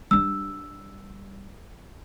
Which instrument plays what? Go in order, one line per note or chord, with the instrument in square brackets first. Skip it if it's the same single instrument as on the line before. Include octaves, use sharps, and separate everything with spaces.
[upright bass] G3 D4 [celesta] E6